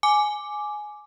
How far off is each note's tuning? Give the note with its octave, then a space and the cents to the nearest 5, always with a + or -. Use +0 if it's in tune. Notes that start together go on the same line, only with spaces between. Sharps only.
G#5 +10 D6 +0